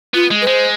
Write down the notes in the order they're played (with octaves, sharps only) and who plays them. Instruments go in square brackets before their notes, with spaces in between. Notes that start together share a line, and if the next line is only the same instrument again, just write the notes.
[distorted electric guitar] B3 [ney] F4
[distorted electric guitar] G#3
[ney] B4
[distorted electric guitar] G#3 [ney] C5